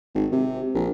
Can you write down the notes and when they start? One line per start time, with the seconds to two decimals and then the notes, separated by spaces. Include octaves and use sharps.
0.15 G#1
0.32 C3
0.75 A#1